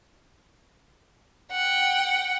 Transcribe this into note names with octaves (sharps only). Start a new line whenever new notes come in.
F#5 G5